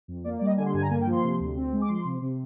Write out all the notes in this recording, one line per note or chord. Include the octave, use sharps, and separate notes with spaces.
F2
A#3 D5
G3 D5
D#5
D3 G#5
C6
G2 G#5
A#5
A#3 G#5
G5
F3
C6
C3
D2
C4
G#3
D6
F3 C6
C3
C3